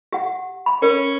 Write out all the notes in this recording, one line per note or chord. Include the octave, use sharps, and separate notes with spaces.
G4 F#5
B5
C#4 A#4